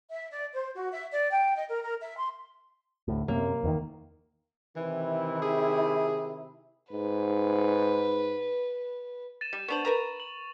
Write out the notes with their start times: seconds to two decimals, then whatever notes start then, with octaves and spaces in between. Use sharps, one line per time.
0.10 E5
0.30 D5
0.53 C5
0.75 F#4
0.92 E5
1.11 D5
1.31 G5
1.55 D#5
1.68 A#4
1.82 A#4
2.00 E5
2.18 C6
3.08 D2 A2
3.28 F#2 C3 A#3
3.63 E2 D3 D#3
4.76 C3 D#3 E3 E4
5.42 G#4
6.92 G#2 B4
9.41 A6 D#7 E7
9.53 G3
9.68 B3 D4 C5 C#6 F7 F#7
9.85 A#4 B4 A#5
10.20 F#7